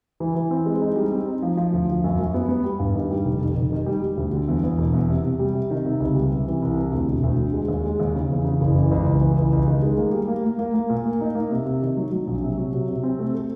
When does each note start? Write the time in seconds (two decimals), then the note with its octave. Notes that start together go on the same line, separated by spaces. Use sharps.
0.20 E3
0.35 E3
0.51 C4
0.66 G#3
0.81 D#4
0.96 G3
1.12 C4
1.27 D#4
1.42 F3
1.57 F3
1.73 D2
1.88 F3
2.04 F#2
2.19 F#2
2.34 B3
2.49 B3
2.64 G3
2.80 G2
2.94 D#3
3.11 G3
3.25 F1
3.40 F1
3.55 F1
3.72 D#3
3.86 G3
4.02 G3
4.17 D2
4.32 D3
4.48 E2
4.64 E2
4.78 E1
4.94 E2
5.09 C3
5.24 C3
5.39 G3
5.55 C3
5.71 D#3
5.86 C3
6.00 C#2
6.16 G3
6.31 C3
6.47 E3
6.62 C2
6.76 C3
6.92 D2
7.08 E1
7.23 D2
7.38 D3
7.53 G#3
7.68 D#2
7.84 G#3
7.99 D#2
8.15 C#3
8.30 E2
8.45 C#3
8.61 F#1
8.76 E3
8.91 C#2
9.06 C#2
9.21 E3
9.37 C#2
9.53 C#2
9.68 D#3
9.82 G#3
9.98 A#3
10.13 G3
10.28 A#3
10.44 A#3
10.59 A#3
10.74 A#3
10.90 A#2
11.06 A#3
11.21 D#4
11.35 A#3
11.51 C3
11.66 C3
11.82 D#3
11.97 F#3
12.12 F#3
12.27 A#1
12.43 C3
12.57 F#3
12.73 C3
12.88 C3
13.03 C4
13.19 A3
13.34 A3